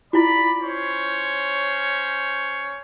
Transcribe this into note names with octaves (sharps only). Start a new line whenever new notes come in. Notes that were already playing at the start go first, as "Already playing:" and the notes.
E4 F4 D5 B5
C#4 C5 C#5